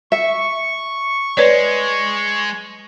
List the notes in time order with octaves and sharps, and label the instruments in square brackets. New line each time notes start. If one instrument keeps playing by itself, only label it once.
[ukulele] E5 [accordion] C#6
[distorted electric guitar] G#3 [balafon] B4 C#5 D5